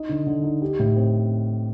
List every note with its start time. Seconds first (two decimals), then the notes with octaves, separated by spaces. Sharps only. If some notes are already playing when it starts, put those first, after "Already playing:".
Already playing: D#4
0.09 D3
0.27 D3
0.44 D#4
0.62 G4
0.79 A2
0.96 C4